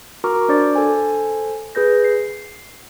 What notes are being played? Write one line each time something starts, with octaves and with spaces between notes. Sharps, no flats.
F#4 A#4 A#5 C#6 D6 F6
D4 C5 D5 D6 A6
A4 C5 G#5
G#4 B4 G6 A#6
C7